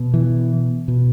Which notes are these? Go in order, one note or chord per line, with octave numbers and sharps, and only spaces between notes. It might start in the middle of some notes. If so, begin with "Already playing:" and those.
Already playing: B2
E3
B2